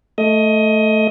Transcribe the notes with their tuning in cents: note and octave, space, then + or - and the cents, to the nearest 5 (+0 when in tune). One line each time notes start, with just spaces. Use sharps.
A3 +0 D#5 +20